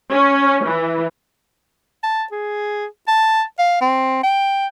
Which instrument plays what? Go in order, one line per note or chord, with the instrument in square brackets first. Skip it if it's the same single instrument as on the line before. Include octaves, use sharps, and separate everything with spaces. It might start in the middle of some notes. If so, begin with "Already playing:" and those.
[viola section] C#4
E3
[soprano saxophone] A5
G#4
A5
F5
C4
G5